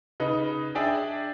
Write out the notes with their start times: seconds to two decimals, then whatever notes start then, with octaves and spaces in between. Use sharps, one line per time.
0.20 C#3 D#4 B4
0.75 D4 G#4 D5 E5 G5 G#5